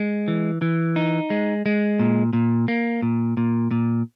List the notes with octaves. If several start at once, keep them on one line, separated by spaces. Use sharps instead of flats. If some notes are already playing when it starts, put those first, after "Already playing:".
Already playing: G#3
E3
E3
D#4
G#3
G#3
A#2
A#2
A#3
A#2
A#2
A#2